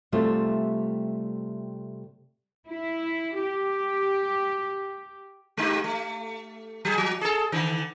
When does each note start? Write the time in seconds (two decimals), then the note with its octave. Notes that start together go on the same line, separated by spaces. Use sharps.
0.12 C3 G3 A3 F4 E5
2.67 E4
3.38 G4
5.57 G#3 D#4 G4
5.84 A3
6.85 F#3 G#4
6.98 F3
7.21 G#4 A4
7.52 D3 D#3